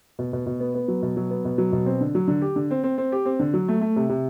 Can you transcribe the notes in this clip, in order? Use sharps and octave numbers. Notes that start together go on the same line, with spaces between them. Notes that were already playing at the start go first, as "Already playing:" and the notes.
B2
B2
B2
B3
B3
F#3
B2
F#3
B3
B2
F#3
B2
C4
D3
F#3
D3
G4
D3
C4
C4
C4
G4
C4
D3
F#3
A3
A3
C3
C3